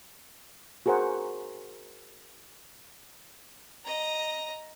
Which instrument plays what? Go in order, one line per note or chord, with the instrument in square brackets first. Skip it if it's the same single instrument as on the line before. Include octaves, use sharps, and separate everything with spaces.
[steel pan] F#4 G#4 A#4 C5 F#5
[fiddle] D#5 A#5